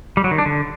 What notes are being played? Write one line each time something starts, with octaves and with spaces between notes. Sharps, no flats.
G3
F#3
D#3
D4
D3